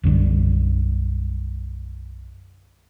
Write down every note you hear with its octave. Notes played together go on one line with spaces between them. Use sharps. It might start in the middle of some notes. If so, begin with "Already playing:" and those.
B1 F#2 D3 G3